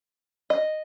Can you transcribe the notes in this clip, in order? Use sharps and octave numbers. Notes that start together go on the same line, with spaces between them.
D#5